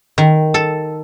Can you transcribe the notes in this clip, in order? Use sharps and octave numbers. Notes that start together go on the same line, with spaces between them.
D#3
A4